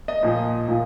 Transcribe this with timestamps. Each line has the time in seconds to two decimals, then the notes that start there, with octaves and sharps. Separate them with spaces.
0.08 D#5
0.23 A#2 F3
0.68 A#2 F3